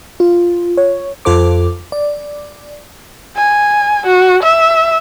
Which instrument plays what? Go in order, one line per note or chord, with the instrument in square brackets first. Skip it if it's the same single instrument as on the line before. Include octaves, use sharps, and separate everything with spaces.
[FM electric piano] F4
C#5
F2 F4 A4 C5 D6
D5
[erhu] G#5
F#4
E5